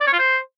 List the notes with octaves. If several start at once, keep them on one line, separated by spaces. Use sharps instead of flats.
D5
C#5
F4
C5